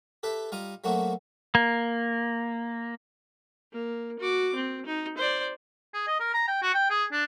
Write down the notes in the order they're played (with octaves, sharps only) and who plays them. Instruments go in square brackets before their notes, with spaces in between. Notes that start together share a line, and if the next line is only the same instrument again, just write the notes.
[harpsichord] G4 A4 B4 E5
G3 F4 D#5 A#5 D#6
F#3 A3 A#3 C4 E4 F#4
[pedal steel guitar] A#3
[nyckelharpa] A#3
F#4 D6
C4
D#4
C5 D5
[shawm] G#4
D#5
A#4
A#5
G5
F#4
G5
G#4
D4